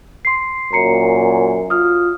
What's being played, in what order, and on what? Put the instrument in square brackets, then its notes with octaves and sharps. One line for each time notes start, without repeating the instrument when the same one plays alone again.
[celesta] C6 C7
[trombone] F#2 [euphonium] A#2 [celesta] A#5 C7 C#7
[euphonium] F4 [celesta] D#6 F6